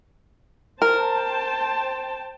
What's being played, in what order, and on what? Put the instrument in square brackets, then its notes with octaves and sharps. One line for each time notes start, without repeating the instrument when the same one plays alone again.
[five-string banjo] A#4 [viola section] C5 G5 A5